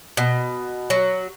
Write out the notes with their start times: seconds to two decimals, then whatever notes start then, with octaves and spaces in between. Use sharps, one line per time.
0.17 B2
0.90 F#3